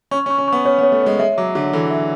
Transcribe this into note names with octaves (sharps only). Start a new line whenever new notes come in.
C#4 C#6
C#4
C#6
C#4
B3 C#6
C#4 C#5
B3
C#5
A3
G#3 C#5
G#3 E5
F#3 D6
D3 D6
E3 A4
E5